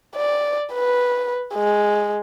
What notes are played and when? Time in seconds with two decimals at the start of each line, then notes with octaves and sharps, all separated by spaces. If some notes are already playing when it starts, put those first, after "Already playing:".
0.16 D5
0.74 B4
1.55 G#3